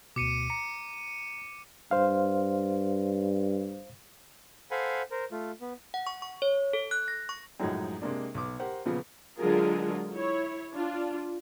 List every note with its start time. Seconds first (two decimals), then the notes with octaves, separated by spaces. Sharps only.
0.16 D2 B2 D6 C#7 D#7
0.50 A#5 C#7
1.91 G2 C5 F5
4.71 A4 C5 F5 F#5 G#5 B5
5.11 A#4 C5
5.32 A3 F4
5.61 B3
5.94 F#5
6.07 C#6
6.22 C#6
6.42 C#5
6.73 A4
6.91 F#6
7.08 A#6
7.29 C#6
7.60 F#2 A2 F3 F#3 G#3 D#4
8.01 C3 G#3 A#3 D4
8.34 B1 D6
8.60 G4 A#4 C5 F#5
8.85 A#2 C#3 F3 B3
9.37 D3 F#3 G#3 F4 G#4 A#4
10.13 E4 C#5
10.73 D4 F4